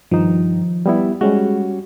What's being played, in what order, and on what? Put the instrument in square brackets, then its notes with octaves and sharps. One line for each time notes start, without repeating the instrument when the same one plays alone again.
[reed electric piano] G2 D#3 D#4 [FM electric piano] F3
[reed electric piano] G3 B3 E4
[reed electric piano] G3 C#4 F#4 [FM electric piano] G#3